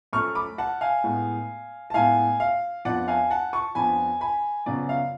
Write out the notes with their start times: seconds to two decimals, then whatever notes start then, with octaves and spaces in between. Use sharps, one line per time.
0.13 F#2 F3 A3 C#6 F6
0.35 B5 D6
0.58 F#5 A5
0.81 F5 G#5
1.04 A2 G#3 B3
1.90 A5
1.94 A2 G#3 B3 F5 G#5
2.40 F5
2.85 F2 F3 B3 D4 F4 D5 F#5
3.08 F5 G#5
3.31 F#5 A5
3.53 A5 C#6
3.75 F2 F3 B3 D4 F4 G#5 B5
4.21 G#5 B5
4.66 F#2 C#3 F3 B3 D5
4.89 F5